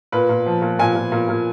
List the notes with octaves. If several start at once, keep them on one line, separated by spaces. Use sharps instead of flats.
A#2 B4
A#2
F3
A#2
A#2 G#5
A#2
A#2
A#2